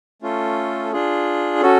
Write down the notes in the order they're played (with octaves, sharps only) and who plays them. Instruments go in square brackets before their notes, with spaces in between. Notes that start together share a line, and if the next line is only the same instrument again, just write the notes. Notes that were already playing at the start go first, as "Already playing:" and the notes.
[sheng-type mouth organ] A3 C#4 F4 A4
D4 F4 G#4
C#4 F#4 A4